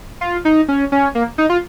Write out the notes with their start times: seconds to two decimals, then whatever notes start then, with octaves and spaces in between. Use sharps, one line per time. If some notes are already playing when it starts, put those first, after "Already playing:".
0.21 F4
0.45 D#4
0.68 C#4
0.92 C#4
1.15 A#3
1.38 D#4
1.50 F4